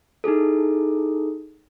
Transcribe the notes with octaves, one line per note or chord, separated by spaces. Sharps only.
D#4 E4 G#4 A4